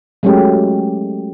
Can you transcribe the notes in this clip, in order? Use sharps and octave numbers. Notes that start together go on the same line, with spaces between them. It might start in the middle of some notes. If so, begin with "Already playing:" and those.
F#3 G#3 A3 C#4 G4